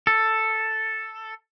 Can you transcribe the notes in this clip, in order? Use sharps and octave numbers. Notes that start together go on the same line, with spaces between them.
A4